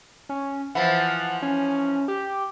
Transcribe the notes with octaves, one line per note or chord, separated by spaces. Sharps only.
C#4
E3 F3 F#5
C#4
G4